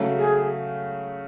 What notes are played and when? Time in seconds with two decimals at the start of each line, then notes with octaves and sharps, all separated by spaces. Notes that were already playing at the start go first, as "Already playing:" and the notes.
Already playing: C#3 F#3 A3
0.18 G#4